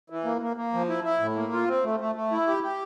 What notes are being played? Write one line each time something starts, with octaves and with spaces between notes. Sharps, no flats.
E3
A#3
A#3
A#3
F3
E4
E4
A2
A#3
F4
C4
A3
A3
A3
E4
G4
G4